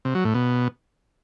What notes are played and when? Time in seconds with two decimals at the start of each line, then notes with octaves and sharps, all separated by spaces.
0.05 C3
0.15 F#3
0.25 A2
0.34 B2